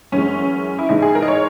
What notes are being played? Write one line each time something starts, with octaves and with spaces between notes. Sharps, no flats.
F#2 E3 G#3 C#4
E4
G#2 E3 G#3 D#4
G#4
A#4
D#5
C#5